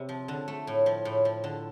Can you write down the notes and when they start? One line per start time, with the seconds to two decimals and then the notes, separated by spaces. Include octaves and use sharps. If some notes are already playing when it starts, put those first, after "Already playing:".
Already playing: C3
0.09 F3
0.28 D3
0.48 A3
0.67 A2
0.86 F3
1.05 A2
1.25 F3
1.44 D3